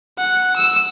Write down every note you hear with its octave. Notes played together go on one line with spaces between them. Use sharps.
F#5
E6